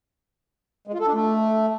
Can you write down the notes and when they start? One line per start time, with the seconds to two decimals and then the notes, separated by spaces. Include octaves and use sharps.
0.87 G#3
0.94 F4
1.00 A4
1.07 D4
1.13 A3